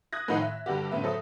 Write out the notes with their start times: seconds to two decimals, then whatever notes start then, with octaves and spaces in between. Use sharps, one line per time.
0.13 D#6 F#6 G#6 A#6
0.28 A2 D#3 F3 D#4 F5 F#5
0.42 E5
0.66 G2 D3 G3 F#4 G4
0.92 F#2 A2 D3 B3 E5
1.04 F#3 A4 C5 E5 D#6